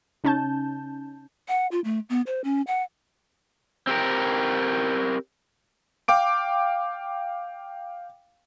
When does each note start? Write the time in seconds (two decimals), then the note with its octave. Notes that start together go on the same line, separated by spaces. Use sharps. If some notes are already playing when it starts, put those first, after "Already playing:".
0.24 C#3 C#4 D#4 A5 G6
1.48 F#5
1.72 F4
1.84 A3
2.10 B3
2.27 C5
2.44 C#4
2.67 F#5
3.87 C4 G4 A#4
6.08 F5 G5 D6 D7